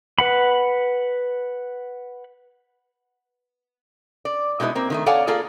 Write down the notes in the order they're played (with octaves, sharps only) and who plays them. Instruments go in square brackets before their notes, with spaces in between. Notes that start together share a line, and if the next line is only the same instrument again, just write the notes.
[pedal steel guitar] B4 F#5 B5
[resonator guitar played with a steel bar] D5
B2 G#3 D#4 E4 B4
A#3 C4
D#3 F3 A3
A4 C#5 D5 F5 F#5 G#5
A#3 F4 G#4 A4 D5